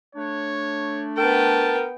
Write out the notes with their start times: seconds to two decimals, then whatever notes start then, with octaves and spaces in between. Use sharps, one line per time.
0.15 A3 D4 C#5
1.17 B3 A#4 G5 A5